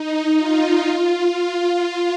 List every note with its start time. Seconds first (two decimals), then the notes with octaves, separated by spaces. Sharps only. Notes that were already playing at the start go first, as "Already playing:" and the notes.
Already playing: D#4
0.38 F4
1.39 F4